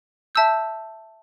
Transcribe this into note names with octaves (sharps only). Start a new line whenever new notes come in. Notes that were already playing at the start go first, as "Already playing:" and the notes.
E5 A5 E6 G6